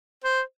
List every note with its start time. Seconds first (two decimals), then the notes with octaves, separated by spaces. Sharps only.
0.24 C5